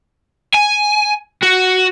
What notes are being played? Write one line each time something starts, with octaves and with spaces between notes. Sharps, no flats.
G#5
F#4